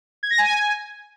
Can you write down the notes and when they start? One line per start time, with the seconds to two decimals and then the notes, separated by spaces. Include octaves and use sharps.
0.23 G#6
0.30 A#6
0.38 G#5